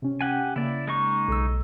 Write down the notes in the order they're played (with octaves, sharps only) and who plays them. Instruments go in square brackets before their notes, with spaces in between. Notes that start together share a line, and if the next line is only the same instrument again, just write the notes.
[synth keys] C3 C#4
[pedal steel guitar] G4 F#5 G#5
[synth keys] C#3 A#3 [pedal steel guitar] E4 D5
[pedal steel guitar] G#3 D#4 C#6
[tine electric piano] B1 E6